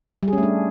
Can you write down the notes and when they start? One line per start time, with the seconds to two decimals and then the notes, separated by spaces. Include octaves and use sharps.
0.23 G3
0.28 G#4
0.33 C#4
0.38 A3
0.43 D4